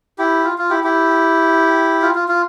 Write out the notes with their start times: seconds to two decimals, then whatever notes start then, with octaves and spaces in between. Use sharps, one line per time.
0.18 E4 G4
0.44 F4
0.58 F4
0.70 E4 G4
0.84 E4 G4
2.02 F4
2.15 F4
2.28 F4